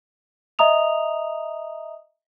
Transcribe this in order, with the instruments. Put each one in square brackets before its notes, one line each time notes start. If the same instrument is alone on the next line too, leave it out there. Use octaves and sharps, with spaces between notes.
[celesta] D#5 E5 A#5 D#6 F7